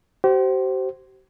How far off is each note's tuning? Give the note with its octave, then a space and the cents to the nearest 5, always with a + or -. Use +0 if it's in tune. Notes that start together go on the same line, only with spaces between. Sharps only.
G4 -45 C5 +0